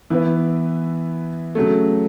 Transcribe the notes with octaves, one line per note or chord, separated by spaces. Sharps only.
E3 B3 E4 B4
C#3 F#3 A3